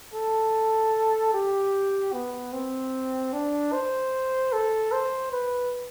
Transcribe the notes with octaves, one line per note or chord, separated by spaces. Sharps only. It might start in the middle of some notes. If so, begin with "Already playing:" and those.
A4
G4
B3
C4
D4
C5
A4
C5
B4